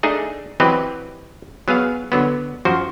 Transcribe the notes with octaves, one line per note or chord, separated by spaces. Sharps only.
A3 D4 D#4 G#4
E3 F#3 C4 G4 B4 D#5
F#3 B3 G#4 F5
D3 F#3 B3
F#2 F3 F#4 C5